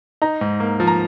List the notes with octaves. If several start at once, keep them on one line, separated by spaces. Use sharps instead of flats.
D#4 A#5
G#2
A#3
F3
A#5